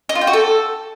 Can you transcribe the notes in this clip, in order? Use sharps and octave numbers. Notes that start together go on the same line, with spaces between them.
D#5
F4
G5
F#4
A4